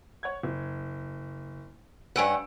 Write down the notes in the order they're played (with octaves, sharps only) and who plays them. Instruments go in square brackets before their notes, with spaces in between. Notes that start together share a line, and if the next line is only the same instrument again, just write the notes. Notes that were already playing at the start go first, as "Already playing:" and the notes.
[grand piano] C#5 F#5 G#6
F#1
[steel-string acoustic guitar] G2 C#4 F#5 [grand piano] B4 E6 D7